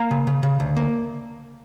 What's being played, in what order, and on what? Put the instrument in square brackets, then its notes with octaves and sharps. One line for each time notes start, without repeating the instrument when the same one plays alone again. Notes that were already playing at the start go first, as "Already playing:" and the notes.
Already playing: [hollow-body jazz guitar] A#3 A#5
C#3
C#3
C#3
D2
A#3